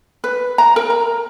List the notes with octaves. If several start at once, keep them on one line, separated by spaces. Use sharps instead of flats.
B4
A#5
A#4
A#5